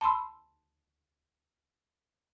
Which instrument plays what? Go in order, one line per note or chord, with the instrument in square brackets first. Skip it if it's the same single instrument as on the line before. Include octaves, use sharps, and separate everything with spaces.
[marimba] A5 B5 C6 E6